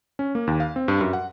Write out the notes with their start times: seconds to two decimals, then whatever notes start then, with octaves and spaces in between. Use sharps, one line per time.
0.19 C#4
0.35 A#3
0.47 D#2
0.60 F5
0.76 C4
0.88 G2
1.01 F#2
1.13 F#5